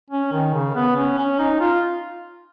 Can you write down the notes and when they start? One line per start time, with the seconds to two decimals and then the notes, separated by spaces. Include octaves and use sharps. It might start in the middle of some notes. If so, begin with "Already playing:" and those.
0.11 C#4
0.32 D#3
0.54 C#3
0.75 B3
0.96 C#4
1.18 C#4
1.39 D#4
1.60 F4